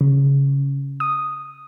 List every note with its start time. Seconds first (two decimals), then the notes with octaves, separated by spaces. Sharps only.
0.01 C#3
1.00 D#6